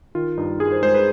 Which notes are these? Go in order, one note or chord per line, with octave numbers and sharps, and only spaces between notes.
D#3 F4
G2 D#4
G2 G#4
C5
G#3 C5
B4